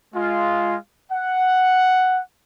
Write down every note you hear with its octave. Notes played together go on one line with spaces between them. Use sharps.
G#3 F4
F#5